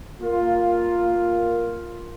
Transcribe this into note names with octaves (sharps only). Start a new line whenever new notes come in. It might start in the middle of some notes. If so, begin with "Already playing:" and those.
A#3 F4